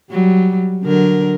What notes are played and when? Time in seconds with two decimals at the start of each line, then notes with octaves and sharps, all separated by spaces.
0.11 F#3 G3
0.84 D3 F#3 A#4